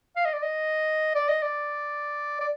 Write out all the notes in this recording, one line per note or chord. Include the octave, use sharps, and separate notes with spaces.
F5
D#5
D5
D#5
D5
D#5
D5
D5